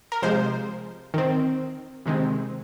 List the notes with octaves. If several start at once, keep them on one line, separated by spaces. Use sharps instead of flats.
A#4
C3 F3 G#3 C5
D#3 C4
C3 D#3 G#3 C4